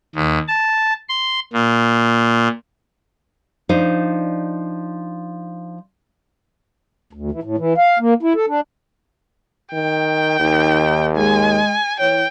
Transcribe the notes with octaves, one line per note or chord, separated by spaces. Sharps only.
D#2
A5
C6
A#2
F3 D4 D#4 C5
D2
E3
A2
E3
F5
A#3
E4
A4
D4
D#3 G5
D#2 D#3
G#3 G#5
E3 C#5 G5